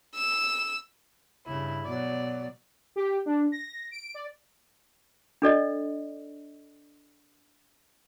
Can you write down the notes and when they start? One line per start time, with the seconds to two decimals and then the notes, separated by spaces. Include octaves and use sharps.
0.15 E6
1.46 G2 C#3 E4
1.85 B2 F#3 D5
2.96 G4
3.26 D4
3.52 A#6
3.91 D7
4.14 D5
5.42 D4 A4 D5 D#5